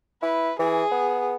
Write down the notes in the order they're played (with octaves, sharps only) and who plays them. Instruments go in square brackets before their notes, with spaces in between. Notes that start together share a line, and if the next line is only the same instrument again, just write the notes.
[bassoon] E4 [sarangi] B4
[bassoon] E3 [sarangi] G#4
[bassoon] B3